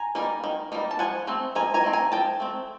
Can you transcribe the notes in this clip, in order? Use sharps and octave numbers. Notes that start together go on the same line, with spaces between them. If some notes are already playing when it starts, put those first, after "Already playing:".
Already playing: G#5 A#5
G3 A#3 D#4
D#3
G3 A#3 D#4
A5
F3 F#5 G#5
A3 C4
F3 G#5 A#5
G#5 A#5
A3 C4 D#4
G#5 A#5
F3 G5 A5
A3 C4